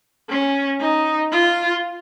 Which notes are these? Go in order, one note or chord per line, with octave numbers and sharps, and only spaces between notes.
C#4
D#4
F4